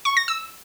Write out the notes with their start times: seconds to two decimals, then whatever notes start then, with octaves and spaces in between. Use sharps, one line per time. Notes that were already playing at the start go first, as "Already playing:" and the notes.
0.05 C#6
0.17 A#6
0.28 E6